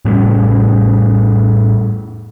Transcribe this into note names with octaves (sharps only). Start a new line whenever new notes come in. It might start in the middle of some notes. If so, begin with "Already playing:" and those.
A2 G3 A3 C#4